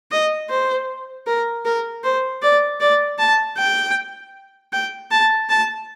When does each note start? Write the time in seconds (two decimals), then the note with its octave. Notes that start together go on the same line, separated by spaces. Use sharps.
0.12 D#5
0.50 C5
1.27 A#4
1.65 A#4
2.04 C5
2.42 D5
2.80 D5
3.19 A5
3.57 G5
4.73 G5
5.11 A5
5.49 A5